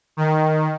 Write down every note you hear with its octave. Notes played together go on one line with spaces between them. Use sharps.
D#3